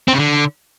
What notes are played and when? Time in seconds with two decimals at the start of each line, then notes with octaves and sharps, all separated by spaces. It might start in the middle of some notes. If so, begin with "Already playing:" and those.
0.08 C4
0.13 C#3
0.18 D3